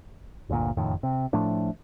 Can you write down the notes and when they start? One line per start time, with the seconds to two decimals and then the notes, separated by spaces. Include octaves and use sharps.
0.49 G1 D2 A#2
0.77 F#1 F2 A2 D#3
1.03 C3
1.33 A2 F3 A3 D4